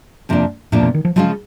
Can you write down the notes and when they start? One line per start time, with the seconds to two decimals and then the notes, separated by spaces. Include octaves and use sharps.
0.29 F2 C3 F3 A#3 D4
0.72 F2 A2 C3 F3 A#3 D4
0.83 B2
0.94 D#3
1.05 F3
1.16 C#3 F3 F#3 G#3 C#4 F4